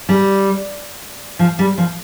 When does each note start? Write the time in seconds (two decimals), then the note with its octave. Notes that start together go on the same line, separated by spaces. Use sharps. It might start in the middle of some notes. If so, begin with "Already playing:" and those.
0.09 G3
1.39 F3
1.59 G3
1.78 F3